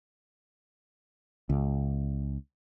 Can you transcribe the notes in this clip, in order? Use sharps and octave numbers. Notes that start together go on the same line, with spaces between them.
C#2